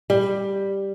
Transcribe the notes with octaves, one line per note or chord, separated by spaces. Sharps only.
G3